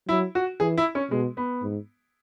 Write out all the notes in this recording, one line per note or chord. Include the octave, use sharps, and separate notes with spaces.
F#3 E4
F#4
E3 G#4
E4
C#4
B2 G#3
B3
G#2